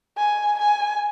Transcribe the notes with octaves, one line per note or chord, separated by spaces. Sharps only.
G#5
G#5